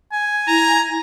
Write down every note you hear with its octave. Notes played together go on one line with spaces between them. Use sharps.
G#5
E4 A#5